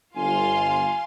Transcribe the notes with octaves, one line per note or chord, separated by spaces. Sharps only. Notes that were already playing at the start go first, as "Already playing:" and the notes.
G1 F4 F5 G#5 C6